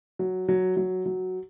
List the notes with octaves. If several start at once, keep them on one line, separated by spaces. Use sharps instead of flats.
F#3
F#3
F#3
F#3